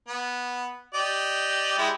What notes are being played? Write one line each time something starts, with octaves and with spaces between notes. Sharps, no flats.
B3
G4 D5 D#5
G#3 E4 G4